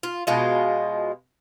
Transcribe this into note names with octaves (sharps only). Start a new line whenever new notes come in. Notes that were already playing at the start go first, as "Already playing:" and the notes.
F4
B2 G#3 F4